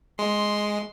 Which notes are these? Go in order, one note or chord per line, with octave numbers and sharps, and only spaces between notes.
G#3 C6